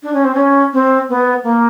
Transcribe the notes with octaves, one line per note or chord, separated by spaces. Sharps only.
D4
C#4
C4
C#4
C4
B3
A#3